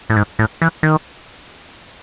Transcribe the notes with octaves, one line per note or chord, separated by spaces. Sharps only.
A2
G#2
A2
E3
D#3